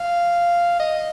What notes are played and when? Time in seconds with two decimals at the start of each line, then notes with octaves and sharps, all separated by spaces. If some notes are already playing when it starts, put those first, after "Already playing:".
Already playing: F5
0.80 D#5